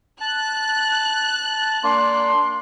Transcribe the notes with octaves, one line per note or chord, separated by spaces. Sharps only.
A5 F#6
A#3 D4 C6